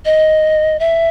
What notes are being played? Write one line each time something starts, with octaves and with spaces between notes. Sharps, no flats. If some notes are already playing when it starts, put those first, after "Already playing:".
D#5
E5